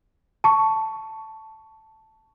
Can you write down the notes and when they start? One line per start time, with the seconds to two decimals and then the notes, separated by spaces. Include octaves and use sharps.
0.44 A5 C#6